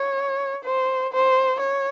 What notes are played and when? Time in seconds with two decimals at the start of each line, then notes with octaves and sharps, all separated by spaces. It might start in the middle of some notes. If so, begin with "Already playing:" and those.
Already playing: C#5
0.64 C5
1.13 C5
1.60 C#5